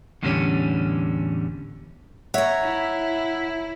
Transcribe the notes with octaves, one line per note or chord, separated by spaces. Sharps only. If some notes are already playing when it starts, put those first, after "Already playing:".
E2 A2 D3 G3 C4 C#4
C#5 E5 F#5 A#5
E4